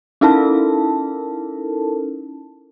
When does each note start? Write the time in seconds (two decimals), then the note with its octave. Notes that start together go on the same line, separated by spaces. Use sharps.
0.21 C#4 D#4 E4 A4 A#4 A5